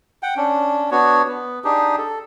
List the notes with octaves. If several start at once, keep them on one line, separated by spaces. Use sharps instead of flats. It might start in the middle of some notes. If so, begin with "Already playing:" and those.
F#5 G5
C#4 D4
B3 D4 F#4 C#5
B3
D4 D#4 G4 G#4
A4